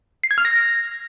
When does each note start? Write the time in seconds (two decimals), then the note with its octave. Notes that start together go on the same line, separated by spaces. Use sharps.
0.24 C7
0.31 G#6
0.38 F6
0.45 A#6